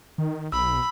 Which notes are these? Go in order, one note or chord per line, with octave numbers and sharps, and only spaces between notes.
D#3
B1 B5 E6